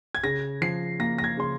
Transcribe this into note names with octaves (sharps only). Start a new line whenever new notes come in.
G#6
C#3 A#6
F3 C7
A#3 A#6
A#6
G#6
C#3 C6